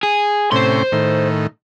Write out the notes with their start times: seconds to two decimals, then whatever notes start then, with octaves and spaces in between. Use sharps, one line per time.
0.03 G#4
0.52 A2 C3 C#4 C5 C6
0.92 A2 D#3